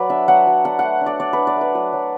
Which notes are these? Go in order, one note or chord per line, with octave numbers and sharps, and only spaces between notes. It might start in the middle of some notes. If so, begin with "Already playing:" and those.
Already playing: F#3 B4 D5
D4 E5
F#3 F#5
F#3
D4 F#5
A3 F#5
D4
D5
D4 D5
B4
D4
D5
A3 B4
F#3 B4
F#3